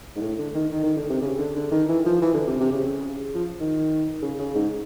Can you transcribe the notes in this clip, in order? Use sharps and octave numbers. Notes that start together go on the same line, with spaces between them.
G#2
A2
D3
D#3
D#3
D#3
D3
C3
C#3
D3
D3
D#3
E3
F3
E3
D3
C3
C3
C#3
F3
D#3
C#3
C#3
G#2